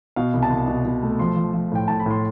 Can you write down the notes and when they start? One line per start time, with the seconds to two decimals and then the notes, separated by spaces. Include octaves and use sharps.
0.16 B2 F5
0.34 C2
0.42 A5
0.51 C2
0.68 B2
0.85 B2
1.03 A3
1.19 F3 C6
1.36 F3
1.54 F3
1.72 A2 G5
1.88 A2 A5
2.00 B5
2.06 A2 C6